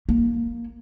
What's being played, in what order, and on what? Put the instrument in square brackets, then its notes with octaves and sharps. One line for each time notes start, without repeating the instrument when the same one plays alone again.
[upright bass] A#3